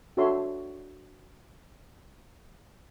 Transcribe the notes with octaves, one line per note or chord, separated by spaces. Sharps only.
D4 F#4 A4 C#5 E5 C6